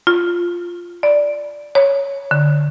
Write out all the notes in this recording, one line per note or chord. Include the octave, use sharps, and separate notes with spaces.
F4
D5
C#5
D3